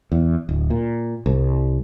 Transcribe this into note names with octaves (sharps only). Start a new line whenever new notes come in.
E2
D1
A#2
C2